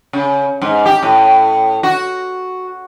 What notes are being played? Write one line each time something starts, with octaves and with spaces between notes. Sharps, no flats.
C#3
G#2
G4
A2
F#4